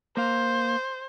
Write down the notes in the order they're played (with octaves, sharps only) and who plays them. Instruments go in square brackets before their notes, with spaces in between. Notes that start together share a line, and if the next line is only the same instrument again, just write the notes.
[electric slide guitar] A#3 F5 [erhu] C5